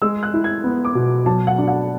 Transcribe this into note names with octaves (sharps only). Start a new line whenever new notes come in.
G#3 E6
F#6
E4
G#6
B3
D6
B2
F#3 A5
F#5
D4
F#5